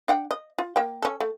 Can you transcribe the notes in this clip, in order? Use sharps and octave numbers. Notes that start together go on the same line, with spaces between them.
D4 F#5 G5
D#5
F4
A#3 G5
C#4 A4
A3